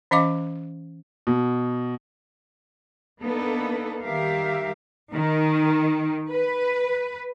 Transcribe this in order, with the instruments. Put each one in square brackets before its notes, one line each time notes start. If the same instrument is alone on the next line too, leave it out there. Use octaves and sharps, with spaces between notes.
[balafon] E3 C#4 D#5 F5 D6
[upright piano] B2
[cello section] A#3 B3 D4 D#4 A4 B4
D#3 G3 G4 A#4 E5 F5
D#3
B4